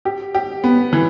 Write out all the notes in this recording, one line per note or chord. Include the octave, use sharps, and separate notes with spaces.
G4
G4
B3
E3